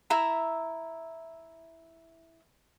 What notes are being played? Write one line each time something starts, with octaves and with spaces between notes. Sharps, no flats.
E4 E5 A#5